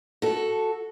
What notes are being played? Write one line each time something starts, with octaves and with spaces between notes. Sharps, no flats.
F#4 A4